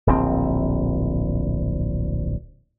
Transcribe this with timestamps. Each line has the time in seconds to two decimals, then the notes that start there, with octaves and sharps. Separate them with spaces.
0.07 D1 A#1 C3 C4